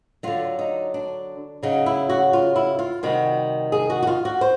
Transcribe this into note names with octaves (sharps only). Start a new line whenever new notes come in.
D3 F#3 F4
D#4
D4
C#3 F#3 D#4
E4
F#4
F4
E4
F4
C3 D#3 G3 F#4
G#4
F#4
F#4
F4
F#4
C5